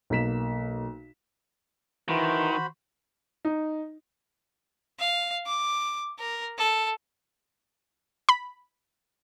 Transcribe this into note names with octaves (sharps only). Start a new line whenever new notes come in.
B1 A#3 B6 E7
D#3 E3 F#4 C5 B5
D#4
F5
D6
A#4
A4
B5